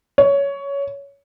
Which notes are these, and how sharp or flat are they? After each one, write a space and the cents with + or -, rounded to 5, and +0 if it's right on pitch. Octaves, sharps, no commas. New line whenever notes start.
C#5 +15